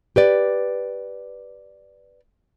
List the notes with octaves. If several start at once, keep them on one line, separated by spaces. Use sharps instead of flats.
G4 B4 D5